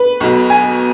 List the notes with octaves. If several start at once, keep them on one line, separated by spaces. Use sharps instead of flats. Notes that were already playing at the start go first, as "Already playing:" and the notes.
Already playing: B4
B1 B2
G#5